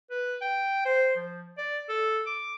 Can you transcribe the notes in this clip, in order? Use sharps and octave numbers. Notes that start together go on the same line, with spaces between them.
B4
G5
C5
F3
D5
A4
D6